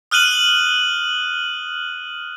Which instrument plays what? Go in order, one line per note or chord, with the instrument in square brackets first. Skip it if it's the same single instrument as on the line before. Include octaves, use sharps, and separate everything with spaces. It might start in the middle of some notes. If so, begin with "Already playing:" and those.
[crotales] D#6 F6 F#6 D#7 F#7